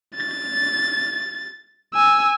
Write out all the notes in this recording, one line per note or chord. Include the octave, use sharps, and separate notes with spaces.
A6
G#5 E6